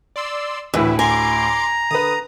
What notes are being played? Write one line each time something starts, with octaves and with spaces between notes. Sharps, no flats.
D5 C6 E6
D2 A2 E3 E4 B4
G#5 A#5 C6 D6 D7
D3 B4 D#6